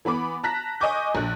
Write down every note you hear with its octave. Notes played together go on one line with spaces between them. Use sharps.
E3 B3 B5 D6
A5 A#5 F#6 A#6 B6
D#5 G#5 C#6 D6 G6
A#1 F#6